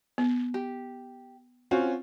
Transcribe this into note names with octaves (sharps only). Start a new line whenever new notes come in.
B3
G4
C4 C#4 F4 F#4